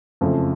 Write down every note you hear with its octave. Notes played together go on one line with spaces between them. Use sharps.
F#1 F2 C#3 F3 A3